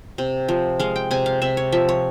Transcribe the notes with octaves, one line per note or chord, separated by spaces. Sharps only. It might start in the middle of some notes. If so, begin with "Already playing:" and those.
C3
F3
G#3 F5
G5
C3 G#5
F5
C3 E5
C#5
F3 E5
C#5